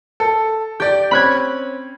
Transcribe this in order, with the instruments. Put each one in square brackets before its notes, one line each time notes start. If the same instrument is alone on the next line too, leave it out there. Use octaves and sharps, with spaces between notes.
[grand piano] A4
[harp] G4 [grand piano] D5 G6
[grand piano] C4 C#4 [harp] B5 F#6 G#6